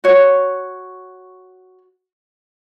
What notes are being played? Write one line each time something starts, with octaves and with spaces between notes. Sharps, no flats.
F#4 C#5